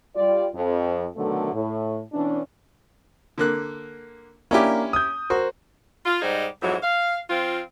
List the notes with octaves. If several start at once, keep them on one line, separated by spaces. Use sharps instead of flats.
G3 F4 D5
F2
B2 D3 D#3 F#3 A3
A2
B2 E3 C#4 D4
D3 A#3 F#6
A#3 C#4 D4 E4 G4
D#6 G6
F#4 A#4 C5
F4
G#2 G3 D#4 G#4 C5
F2 G#2 E3 F#3
F5
F3 C4 F4